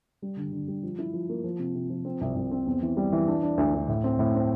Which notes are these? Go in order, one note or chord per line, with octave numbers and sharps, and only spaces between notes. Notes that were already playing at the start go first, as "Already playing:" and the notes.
G3
D3
D3
G3
F3
E4
F3
A#3
F3
C3
C3
F3
C4
C2
C2
C4
E2
E3
G3
E3
D4
D4
D2
D2
A2
C4
A2
C4